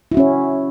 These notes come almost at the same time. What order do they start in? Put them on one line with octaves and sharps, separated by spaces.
E4 F#4 C#4 C#5